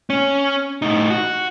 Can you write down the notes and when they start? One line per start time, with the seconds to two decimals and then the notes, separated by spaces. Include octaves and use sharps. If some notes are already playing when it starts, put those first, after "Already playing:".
0.10 C#4
0.82 A2 D#4
1.10 F#4